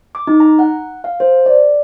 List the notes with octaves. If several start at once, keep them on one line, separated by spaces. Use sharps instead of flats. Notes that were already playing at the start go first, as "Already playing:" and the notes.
D6
D#4
A#5
F#5
F5
C5
D5